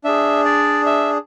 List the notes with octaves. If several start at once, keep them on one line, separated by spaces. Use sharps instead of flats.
D4 G#4 E5
D5
E5